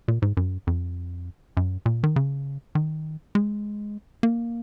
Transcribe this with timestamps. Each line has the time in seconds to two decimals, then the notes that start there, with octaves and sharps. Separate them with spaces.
0.08 A#2
0.22 G#2
0.37 F#2
0.67 F2
1.57 F#2
1.86 A#2
2.03 D#3
2.16 C#3
2.75 D#3
3.35 G#3
4.23 A#3